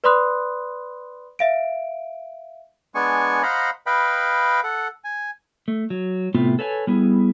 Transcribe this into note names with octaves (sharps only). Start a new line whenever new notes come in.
B4 D5 B5 C6 D#6 F#6
E5 F5 D7
G#3 B3 D4 G#5 C#6
C5 D#5 F5 F#5 A#5 B5
B4 D#5 F5 G5 B5
A4 F#5
G#5
A3
F#3
A2 C3 A3 B3 C4 F4
A4 B4 C#5 F5 G#5
G3 B3 E4 G#4